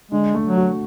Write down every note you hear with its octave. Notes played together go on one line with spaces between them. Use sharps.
D3 G#3
A3
F#3
F#4